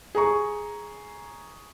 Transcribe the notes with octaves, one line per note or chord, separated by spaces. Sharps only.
G#4 A#5 C#6